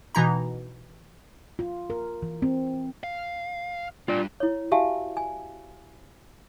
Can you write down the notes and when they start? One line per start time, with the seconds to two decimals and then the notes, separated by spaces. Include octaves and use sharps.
0.15 B2 E3 D#4 A#5
1.59 F4
1.90 A#4
2.22 E3
2.42 C4
3.04 F5
4.08 G3 D4 F4 D5
4.40 E4 C#5
4.72 F#4 G4 E5 F5 G#5 A5
5.17 G#5